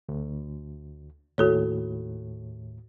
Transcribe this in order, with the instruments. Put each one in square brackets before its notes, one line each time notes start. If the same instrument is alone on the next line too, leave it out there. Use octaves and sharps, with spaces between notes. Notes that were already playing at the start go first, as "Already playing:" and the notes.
[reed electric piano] D2
[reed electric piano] D#2 A2 [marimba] F#4 A4 C#5